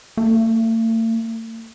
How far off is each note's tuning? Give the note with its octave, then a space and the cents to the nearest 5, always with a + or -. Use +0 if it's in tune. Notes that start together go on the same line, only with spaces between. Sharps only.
A3 +45